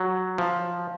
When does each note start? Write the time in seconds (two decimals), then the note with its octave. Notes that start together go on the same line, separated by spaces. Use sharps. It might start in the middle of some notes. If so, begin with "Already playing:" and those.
Already playing: F#3
0.38 F3